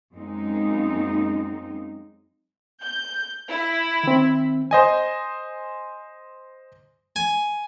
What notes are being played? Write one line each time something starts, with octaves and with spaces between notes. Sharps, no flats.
F#2 G#3 A#3 C4 D#4
G6
E4
D#3 C4
C5 D#5 G#5
G#5